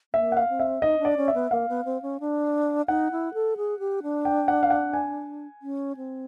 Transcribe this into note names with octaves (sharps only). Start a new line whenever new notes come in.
A#3 E5
F#5
F5
C4
E5
D#4 D#5
D4
D5
C#4
E5
B3
A#3 F5
B3
C4
C#4
D4
D#4 F#5
E4
A4
G#4
G4
D4
G5
F#5
F5
F#5
G#5
C#4
C4